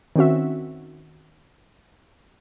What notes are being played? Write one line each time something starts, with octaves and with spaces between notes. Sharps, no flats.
D#3 C4 C#4 F#4 E5